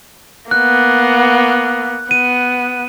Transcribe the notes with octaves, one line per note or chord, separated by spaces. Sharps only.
A#3 B3 F#6
B3 D#7